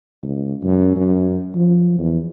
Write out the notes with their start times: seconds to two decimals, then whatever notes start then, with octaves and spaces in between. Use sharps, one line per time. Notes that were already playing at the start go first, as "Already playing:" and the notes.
0.23 C#2
0.63 F#2
0.96 F#2
1.55 F3
1.98 E2